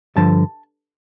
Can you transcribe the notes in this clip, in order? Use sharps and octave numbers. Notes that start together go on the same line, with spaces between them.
G2 D3 F3 A5